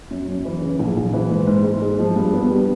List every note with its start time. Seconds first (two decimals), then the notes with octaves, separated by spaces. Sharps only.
0.11 F#2
0.28 F#2
0.45 E3
0.62 C#3
0.79 A#1
0.96 A#1
1.13 E3
1.31 G#2
1.47 G#2
1.64 G#2
1.82 G#3
1.99 F3
2.16 G2
2.33 B3
2.50 G3